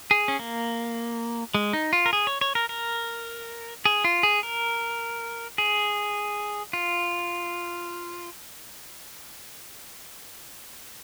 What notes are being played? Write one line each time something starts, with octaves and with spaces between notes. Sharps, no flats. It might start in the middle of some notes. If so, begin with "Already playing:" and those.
G#4
C#4
A#3
G#3
D#4
F4
A#4
G#4
C#5
C#5
A#4
A#4
G#4
F4
G#4
A#4
G#4
F4